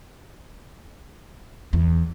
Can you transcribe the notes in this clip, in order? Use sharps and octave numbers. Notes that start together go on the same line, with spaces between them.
E2